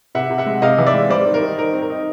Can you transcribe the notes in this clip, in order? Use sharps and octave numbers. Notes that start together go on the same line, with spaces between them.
C3 E5 F#5
C3
E5 F#5
G#3
C3 D#5 F5
E3
D5 E5
G#3
G3 C5 D5
D#3
A#4 C5
D#4
D#3 A#4
C4
A#4
D#4